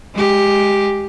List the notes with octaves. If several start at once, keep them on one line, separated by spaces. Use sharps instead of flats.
G#3 G4